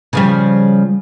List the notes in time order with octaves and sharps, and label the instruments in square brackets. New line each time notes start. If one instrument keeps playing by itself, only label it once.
[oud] C#3 F3 G3